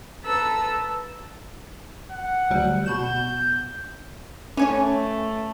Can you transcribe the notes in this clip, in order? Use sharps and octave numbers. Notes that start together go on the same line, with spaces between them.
A4 B4 A#5 E6
F#5
D2 F#3 G3
B2 F#4 G6 E7
E3 A3 C#4 C#5 G#5